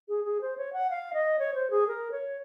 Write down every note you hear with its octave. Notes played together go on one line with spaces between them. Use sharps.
G#4
G#4
C5
C#5
F#5
F5
D#5
C#5
C5
G#4
A#4
C#5